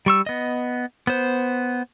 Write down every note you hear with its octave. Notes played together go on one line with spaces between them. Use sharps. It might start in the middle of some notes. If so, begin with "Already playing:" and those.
G3 C#6 E6
B3 D#5
B3 C5